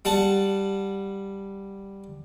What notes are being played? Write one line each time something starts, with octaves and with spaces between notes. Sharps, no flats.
G3 F#5 A5